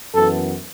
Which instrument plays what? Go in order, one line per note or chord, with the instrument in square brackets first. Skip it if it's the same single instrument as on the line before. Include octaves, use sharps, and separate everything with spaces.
[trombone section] F#2 E3 B3 A4